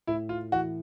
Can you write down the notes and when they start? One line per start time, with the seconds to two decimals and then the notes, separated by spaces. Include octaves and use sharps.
0.07 A2 E4
0.29 F4
0.52 E3 F#4